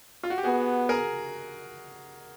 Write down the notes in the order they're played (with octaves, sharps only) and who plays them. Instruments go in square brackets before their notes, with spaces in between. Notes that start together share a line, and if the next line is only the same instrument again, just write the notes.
[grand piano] F4
F#4
G4
[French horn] B3 [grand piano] F#4 G#4
[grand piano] G#4 A#4